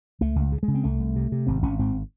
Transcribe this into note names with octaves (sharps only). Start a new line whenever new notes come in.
C#2 A3
C#2
C#3
G#3
C#3
C4
C2 A3
C2
C3
C3
G#1 C4
G#1 C#4
G#2 C4